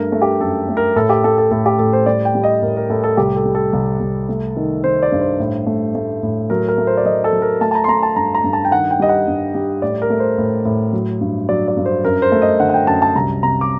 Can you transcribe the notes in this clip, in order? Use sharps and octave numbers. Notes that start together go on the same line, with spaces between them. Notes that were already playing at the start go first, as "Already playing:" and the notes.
Already playing: G2 A3 A#4
A3
G4
F#2 A4
A3
A#4
A2 A4
G4
A3 A4
A4
A2 A4
G4
A2 A4
C5
G3 D5
G5
G3
D#5
A2 A#4
A#4
A2 A4
A4
C2 G4
A4
G3
A4
C2
C2
A3
D#3
D#3 C5
D5
G2
C5
A2
A3
A3
A2
F#3 A#4
A#4
A3
C5
D5
F#3 D#5
A4
F#3
A#4
A3 A5
A5
A#5
C6
A3 A#5
A5
G2 A#5
A#5
G2
A5
G5
D#3 F#5
G5
G3 D#5
F#5
G2
G3
A2 D5
A#4
A3
C5
A2
A2
F#3
G2
F#3 D5
D5
G2
C5
F#2 A#4
C5
A3
D#5
D3 F#5
F#5
G5
F#2 A5
A5
C2 A#5
C3 A#5
D6